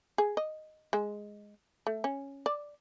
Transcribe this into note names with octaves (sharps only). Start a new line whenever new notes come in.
G#4
D#5
G#3
A3
C#4
D5